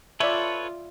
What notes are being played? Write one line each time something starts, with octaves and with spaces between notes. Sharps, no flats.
F4 A4 B4 C#5 D5 E5